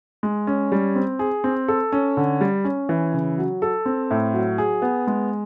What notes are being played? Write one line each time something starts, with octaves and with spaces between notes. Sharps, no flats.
G#3
C#4
G3
C4
G#4
C4
A4
C#4
D3
G3
C#4
E3
C#3
F#3
A4
C4
A2
F#3
G#4
B3
G#3